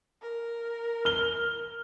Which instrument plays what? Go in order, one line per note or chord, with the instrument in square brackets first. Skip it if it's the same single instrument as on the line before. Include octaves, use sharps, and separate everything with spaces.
[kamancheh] A#4
[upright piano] F6 G7